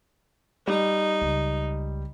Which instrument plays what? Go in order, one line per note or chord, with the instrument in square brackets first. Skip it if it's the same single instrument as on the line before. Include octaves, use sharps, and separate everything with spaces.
[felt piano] G3 [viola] D#4
[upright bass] C#2